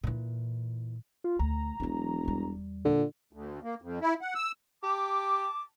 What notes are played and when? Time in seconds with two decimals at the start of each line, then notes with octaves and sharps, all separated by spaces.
0.03 A#2 E3
1.24 F4
1.39 D2 A#5
1.80 E1 E3 F#3
2.25 E2 G3
2.85 A#2 D3
3.33 D2
3.63 A#3
3.82 F2
4.01 E4
4.21 F#5
4.35 E6
4.83 G4 A5 D6